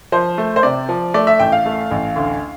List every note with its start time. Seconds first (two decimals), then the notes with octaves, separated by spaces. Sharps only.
0.12 F3 C5
0.38 A3
0.56 C5
0.63 C3 D5
0.89 F3
1.14 A3 D5
1.27 E5
1.40 A1 G5
1.52 F5
1.66 A3
1.91 A1
2.16 D2